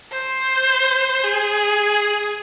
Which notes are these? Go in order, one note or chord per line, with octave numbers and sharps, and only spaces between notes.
C5
G#4